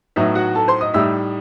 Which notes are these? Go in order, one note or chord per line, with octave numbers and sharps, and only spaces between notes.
A2 F#3 B3 D#4 E5
F#4 F#5
A4 A5
C5 C6
D#5 D#6
A2 G3 D#4 E5 E6